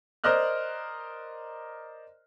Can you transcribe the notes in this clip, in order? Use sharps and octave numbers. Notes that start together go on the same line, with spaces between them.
A#4 C5 D5 D#5 F6 F#6